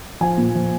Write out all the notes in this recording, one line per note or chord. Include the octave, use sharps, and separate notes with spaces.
F3 G#5
A#2
F3